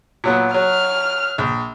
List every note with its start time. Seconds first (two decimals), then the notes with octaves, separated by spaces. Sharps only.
0.24 A#2 F#3 B3
0.54 F#3 F6
1.38 A#1